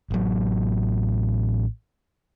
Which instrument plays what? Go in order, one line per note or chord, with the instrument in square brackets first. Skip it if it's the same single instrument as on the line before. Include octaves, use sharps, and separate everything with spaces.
[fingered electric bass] A1 F#3